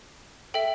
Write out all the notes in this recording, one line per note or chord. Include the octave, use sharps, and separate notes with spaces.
A4 E5 G5